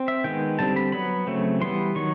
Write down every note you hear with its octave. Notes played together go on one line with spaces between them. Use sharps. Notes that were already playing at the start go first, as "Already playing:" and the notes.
Already playing: C4
E5
D#3 G#3 B3 G5
D3 G3 C4 A5
B5
F#3 B3 B5
C#3 F#3 A3 C4
E3 G3 B3 C6
D#3 F#3 C#6